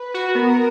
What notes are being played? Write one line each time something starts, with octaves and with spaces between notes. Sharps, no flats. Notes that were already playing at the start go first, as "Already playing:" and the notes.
Already playing: B4
F#4
B3 A#4